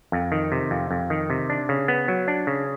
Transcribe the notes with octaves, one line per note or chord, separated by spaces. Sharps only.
F2
D#3
C3
F2
F2
D#3
C3
D4
C#3
B3
F#3
D4
C#3